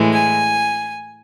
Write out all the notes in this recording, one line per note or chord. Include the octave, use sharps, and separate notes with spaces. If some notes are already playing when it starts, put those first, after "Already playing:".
Already playing: A2 E3 G#3
G#5